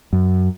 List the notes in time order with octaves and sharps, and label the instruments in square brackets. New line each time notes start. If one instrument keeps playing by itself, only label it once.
[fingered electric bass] F#2